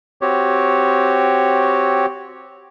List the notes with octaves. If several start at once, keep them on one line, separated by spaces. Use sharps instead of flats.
C4 F#4 G4 C#5